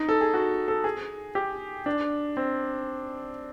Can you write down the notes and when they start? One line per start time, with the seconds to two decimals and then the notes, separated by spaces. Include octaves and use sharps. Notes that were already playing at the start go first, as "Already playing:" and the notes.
Already playing: D#4
0.09 A4
0.21 G#4
0.34 F#4
0.68 A4
0.84 G#4
1.35 G4
1.86 D4
2.37 C4